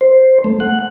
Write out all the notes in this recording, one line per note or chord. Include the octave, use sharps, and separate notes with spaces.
C5
A3
F#5